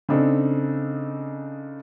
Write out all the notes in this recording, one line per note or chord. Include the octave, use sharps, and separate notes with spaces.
C#3 C4 D4 D#4 A4